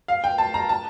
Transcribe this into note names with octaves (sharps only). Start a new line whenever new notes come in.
F5
G5
A5
A#5
A5